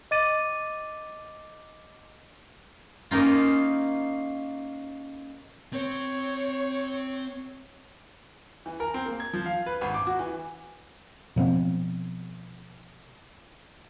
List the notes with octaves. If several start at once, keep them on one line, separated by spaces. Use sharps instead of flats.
D#5 D6 A6 D#7
A#3 C#4 D#4 F4
C4 C5 C#5
E3
A#4
C4
A#3
G#6
F3
F5
B4
G#1
D6
F#4
E3
B2 F3 B3 C4